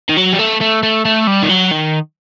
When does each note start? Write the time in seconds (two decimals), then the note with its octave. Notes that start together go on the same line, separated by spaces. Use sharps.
0.09 D#3
0.17 F#3
0.33 G3
0.39 A3
0.61 A3
0.83 A3
1.05 A3
1.27 G3
1.43 D#3
1.50 F#3
1.71 D#3